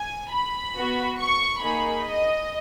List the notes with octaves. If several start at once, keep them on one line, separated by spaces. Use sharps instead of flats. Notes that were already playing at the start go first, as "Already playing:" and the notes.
Already playing: G#5
B5
B3 F#4
C#6
A#3 D#4 G#4 B5
D#5